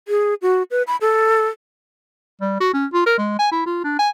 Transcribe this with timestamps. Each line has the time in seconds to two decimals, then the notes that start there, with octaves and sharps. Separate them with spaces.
0.08 G#4
0.42 F#4
0.71 B4
0.87 B5
1.01 A4
2.41 G3
2.60 F#4
2.74 C#4
2.93 F4
3.06 A#4
3.18 G#3
3.39 G#5
3.52 E4
3.66 F4
3.84 D4
3.99 G#5